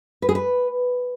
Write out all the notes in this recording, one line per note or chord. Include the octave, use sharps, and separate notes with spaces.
B4
G#4
B4